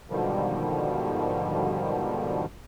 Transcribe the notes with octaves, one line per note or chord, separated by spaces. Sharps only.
G#2 B2 D3 D#3 F3 G3